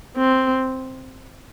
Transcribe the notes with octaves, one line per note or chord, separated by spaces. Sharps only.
C4